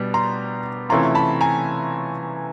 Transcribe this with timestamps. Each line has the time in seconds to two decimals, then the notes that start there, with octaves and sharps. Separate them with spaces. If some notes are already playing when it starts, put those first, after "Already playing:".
Already playing: B2 G3 B3 D4
0.14 A#5 C6
0.89 C3 E3 A3 C#4 F4 A#5 C6
1.15 A5 B5
1.41 G#5 A#5